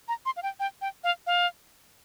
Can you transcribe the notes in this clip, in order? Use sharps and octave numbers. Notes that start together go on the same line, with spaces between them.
A#5
C6
F5
G5
G5
G5
F5
F5